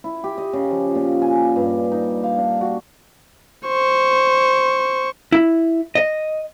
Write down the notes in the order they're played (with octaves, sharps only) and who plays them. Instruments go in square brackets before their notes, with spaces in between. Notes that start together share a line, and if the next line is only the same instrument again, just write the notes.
[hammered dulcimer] E4
G4
D#5
C#3
F3
A#2
G#5
G2
D#4
F5
D4
F#4
[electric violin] C5 C#6
[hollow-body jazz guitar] E4
D#5